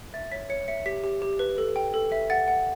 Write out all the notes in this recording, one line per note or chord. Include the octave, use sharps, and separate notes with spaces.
E5 A6
C#5 B6
C#5 C#7
E5 C#7
G4 B6
G4
G4
B4
A4
G5
A4
E5
F#5 A6
F#5